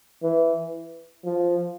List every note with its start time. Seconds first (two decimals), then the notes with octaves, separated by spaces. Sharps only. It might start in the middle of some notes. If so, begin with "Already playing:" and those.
0.22 E3
1.24 F3